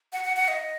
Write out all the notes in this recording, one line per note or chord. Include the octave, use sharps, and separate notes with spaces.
F#5
F#5
F#5
D#5